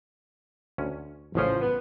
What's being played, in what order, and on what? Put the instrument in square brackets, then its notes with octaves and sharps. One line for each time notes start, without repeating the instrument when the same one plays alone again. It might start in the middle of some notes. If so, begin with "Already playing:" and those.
[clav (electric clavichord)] D2 C#4
[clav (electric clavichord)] A1 C#3 C#4 [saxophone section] F3
[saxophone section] B3